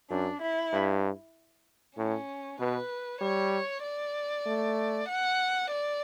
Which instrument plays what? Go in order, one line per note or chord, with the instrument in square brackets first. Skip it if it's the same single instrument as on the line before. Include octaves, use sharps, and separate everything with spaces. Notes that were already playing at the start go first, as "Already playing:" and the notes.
[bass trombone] F#2 [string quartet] D4
[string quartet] E4
[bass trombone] G2
[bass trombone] A2 [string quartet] C#4
[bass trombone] B2 [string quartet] B4
[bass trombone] G3 [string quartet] C#5
[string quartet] D5
[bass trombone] A3
[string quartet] F#5
D5